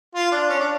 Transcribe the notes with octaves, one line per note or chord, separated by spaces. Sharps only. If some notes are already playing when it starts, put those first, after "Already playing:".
F4
D4
C#4
D4